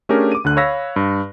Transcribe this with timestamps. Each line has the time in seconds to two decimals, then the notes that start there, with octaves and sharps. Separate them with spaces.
0.09 A3 C#4 D4 G4 G#4 A#4
0.32 D6 D#7
0.44 D2 D3 F#6
0.57 C#5 F5 B5 E6 A#6 B6
0.96 G2